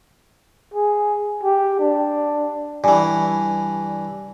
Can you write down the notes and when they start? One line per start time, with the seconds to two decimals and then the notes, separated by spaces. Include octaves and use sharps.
0.74 G#4
1.43 G4
1.79 D4
2.84 G2 E3 D5 G#5